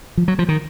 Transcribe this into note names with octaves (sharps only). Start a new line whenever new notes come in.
F3
F#3
F3
D#3